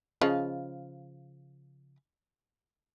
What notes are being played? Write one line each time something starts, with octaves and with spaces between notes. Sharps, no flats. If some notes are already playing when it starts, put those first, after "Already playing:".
C#3 F3 D#5